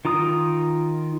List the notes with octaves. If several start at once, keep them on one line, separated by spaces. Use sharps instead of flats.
D#3 F4 A#5 D#6